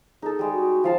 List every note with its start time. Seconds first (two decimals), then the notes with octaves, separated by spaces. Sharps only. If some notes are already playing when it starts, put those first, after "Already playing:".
0.22 D#4 G#4 A4
0.39 G3 G#3
0.53 F#4
0.84 F3 F5 A5